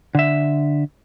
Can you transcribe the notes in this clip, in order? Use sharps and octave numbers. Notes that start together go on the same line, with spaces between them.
D3 E5